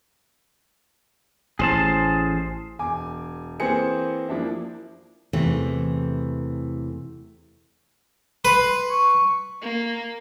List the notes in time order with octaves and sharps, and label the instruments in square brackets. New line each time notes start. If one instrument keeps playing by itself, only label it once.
[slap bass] A1 [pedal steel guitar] G#4 C5 A5
[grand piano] E1 G#5 D6
E3 A#3 C4 G#4 C5 C#7
F3 A#3 D4 E4
[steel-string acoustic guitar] E2 C3 E3 A3
[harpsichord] B4 [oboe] C6
[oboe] C#6
[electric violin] A#3